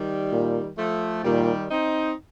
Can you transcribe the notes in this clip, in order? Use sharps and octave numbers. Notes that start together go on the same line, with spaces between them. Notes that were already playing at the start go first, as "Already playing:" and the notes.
Already playing: D#3 G3
A#2
F3 A3
A#2 D#3 G3
C4 D#4